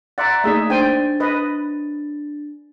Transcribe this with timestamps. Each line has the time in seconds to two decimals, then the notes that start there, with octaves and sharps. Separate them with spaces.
0.18 D5 E5 F#5 A#5 C6 A6
0.44 A3 A#3 D#4 G#4 D5 E5
0.70 D4 C5 G5 G#5 A6
1.20 B4 D#5